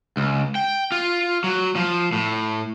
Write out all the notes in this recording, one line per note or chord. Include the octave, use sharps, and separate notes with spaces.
C#2
G5
F4
F#3
F3
A2